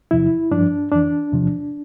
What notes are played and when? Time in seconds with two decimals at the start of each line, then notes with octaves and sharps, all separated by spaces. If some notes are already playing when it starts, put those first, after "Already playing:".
0.11 E2 C3 F3 E4
0.51 G2 F3 D4
0.92 F2 E3 D4
1.32 E2 C3 F3